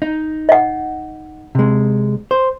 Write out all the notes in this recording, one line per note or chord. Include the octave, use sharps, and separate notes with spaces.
D#4
D#5 F#5
C3 G#3
C5